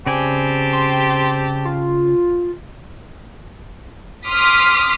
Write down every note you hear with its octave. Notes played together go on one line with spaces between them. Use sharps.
C#3 C4 G4 D5 G#5 A5
C6
F4
C6 D6 D#6 F6 B6